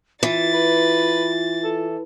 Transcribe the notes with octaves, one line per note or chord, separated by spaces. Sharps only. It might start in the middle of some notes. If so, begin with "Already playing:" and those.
E3 F4 A6
B4
A4